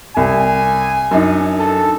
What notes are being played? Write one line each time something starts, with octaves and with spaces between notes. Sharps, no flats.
C2 G#5
F#2 D4 D#4
A4